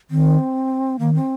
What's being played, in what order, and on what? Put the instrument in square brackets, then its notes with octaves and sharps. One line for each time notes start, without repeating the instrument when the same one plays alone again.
[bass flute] D#3 [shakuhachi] C4
[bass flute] D#3 [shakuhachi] A#3
[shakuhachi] C4